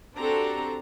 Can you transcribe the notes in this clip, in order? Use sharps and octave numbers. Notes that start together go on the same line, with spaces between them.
C4 D4 F#4 G4 A4 A#5